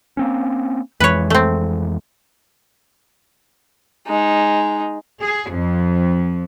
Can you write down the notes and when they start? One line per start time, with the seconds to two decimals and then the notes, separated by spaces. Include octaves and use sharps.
0.17 A#3 C4 C#4
1.00 F2 E3 G#3 B4 C#5
1.30 A3 C4
4.07 G#3 D#4
5.21 G#4
5.52 F2